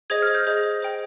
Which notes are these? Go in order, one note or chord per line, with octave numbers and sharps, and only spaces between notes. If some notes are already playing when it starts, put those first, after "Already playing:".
G#4 C5 D#5 G#6
F6
G6
G#4 C5 D#5
C5 G5